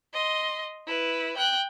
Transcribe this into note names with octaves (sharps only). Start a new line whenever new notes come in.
D#5 C6
E4 B4
G5 F#6